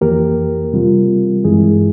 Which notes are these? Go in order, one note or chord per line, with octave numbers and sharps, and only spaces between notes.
F2 E3 A#3 G4 A#4
C3 G3 C4 F4
G2 E3 G#3 E4 G#4